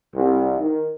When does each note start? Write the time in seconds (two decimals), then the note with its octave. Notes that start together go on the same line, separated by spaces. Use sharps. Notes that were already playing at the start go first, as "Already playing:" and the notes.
0.14 C2
0.57 D#3